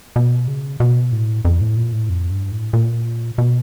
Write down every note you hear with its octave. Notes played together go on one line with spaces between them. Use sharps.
B2
C#3
B2
A2
F2
A2
A#2
A2
F2
G2
A2
A#2
B2